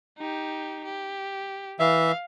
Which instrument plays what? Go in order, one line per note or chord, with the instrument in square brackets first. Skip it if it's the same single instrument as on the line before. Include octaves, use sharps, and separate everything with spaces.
[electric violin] D#4 G4
G4
[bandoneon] E3 E5 [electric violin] F5